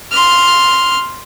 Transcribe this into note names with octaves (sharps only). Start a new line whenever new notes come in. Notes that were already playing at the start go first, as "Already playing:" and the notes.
C6 F6